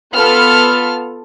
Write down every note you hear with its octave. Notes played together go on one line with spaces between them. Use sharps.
B3 F4 A4 F6